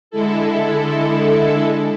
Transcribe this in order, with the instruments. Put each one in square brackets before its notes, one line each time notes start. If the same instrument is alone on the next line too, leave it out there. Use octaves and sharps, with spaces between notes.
[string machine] D3 G#3 E4 A4